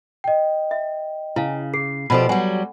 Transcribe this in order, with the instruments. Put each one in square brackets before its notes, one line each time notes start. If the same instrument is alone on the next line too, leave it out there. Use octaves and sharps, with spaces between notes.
[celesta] D#5 G5
[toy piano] E5
[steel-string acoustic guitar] C#3 [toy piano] E4 F5
[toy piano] G#4 [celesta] C7
[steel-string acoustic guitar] B2 F3 G4 [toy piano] A4 D5 B5
[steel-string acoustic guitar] F#3 G3 [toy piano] F#5 G#5